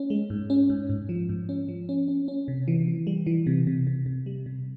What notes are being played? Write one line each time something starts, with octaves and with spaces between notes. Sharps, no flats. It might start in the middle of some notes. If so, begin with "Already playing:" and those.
Already playing: C#4
G#3
G#2
C#4
G#2
G#2
F3
G#2
C#4
F3
C#4
C#4
C#4
C3
E3
E3
G3
E3
C3
C3
C3
C3
G3
C3